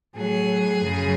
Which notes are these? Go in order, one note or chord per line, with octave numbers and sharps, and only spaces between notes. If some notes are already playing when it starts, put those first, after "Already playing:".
A2 F#3 G#4
F#2 C#3 F#3